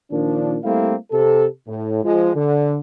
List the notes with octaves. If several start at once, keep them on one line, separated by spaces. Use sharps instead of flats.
A#2 D#3 F3 D4
G3 A3 A#3 C4 E4 F5
C3 A4
A2
F3 G#3
D3